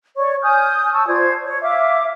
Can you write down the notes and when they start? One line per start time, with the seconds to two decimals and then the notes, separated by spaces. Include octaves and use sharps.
0.16 C#5 D5 C#6
0.42 G#5 D#6 F6 G6
0.92 A5 C#6 E6
1.08 F4 C5 D5 G#6
1.44 C#5
1.62 E5 F5 D6